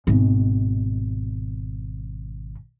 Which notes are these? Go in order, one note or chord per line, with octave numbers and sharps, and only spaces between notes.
G#1 B2